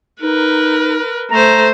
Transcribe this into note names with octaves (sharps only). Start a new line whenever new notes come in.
D#4 A#4 B4
A3 C5 A#5